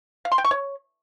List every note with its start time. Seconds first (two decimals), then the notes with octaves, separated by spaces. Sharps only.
0.25 F5
0.32 C6
0.38 G5
0.44 C#6
0.51 C#5